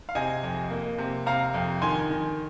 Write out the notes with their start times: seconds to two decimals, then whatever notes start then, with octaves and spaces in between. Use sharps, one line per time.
0.09 F5
0.15 C3 D#5 G#5
0.43 F2
0.70 A#3
0.98 C3
1.26 C3 F5 A#5
1.54 F2
1.82 D#3 G#5 C6
2.10 D#3